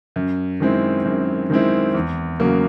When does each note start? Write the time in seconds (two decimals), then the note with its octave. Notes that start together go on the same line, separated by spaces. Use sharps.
0.16 F#2
0.60 D#3 G#3 C4 E4
1.05 F#2
1.50 D#3 G#3 C4 E4
1.94 E2
2.40 C#3 F#3 A#3